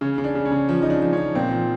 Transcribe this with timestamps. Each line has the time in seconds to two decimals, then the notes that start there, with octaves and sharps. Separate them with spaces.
0.01 C#3 C#4
0.18 C#3
0.24 D4
0.35 C#3
0.45 C#4
0.52 C#3
0.69 F3
0.82 D#4
0.85 F3 D4
1.02 F3
1.13 C#4
1.17 F3
1.35 A#2 C4
1.52 F3